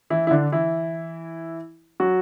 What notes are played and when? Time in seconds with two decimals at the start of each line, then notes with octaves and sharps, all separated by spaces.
0.10 E3 E4
0.27 E4
0.31 D3 D4
0.52 E3 E4
2.00 F#3 F#4